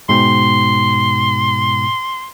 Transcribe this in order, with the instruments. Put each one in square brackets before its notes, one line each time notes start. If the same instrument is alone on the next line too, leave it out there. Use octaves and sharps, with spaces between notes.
[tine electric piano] G#2 B2 G5 [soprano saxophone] C6